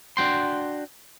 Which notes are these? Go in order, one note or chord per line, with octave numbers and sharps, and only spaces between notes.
D4 F#4 G5 C6